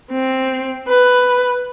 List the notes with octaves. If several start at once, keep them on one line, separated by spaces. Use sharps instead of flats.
C4
B4